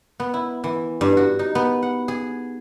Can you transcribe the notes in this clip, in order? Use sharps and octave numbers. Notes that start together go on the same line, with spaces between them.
B3
E4
E3
G2
F#4
D#4
B3
F#5
G#4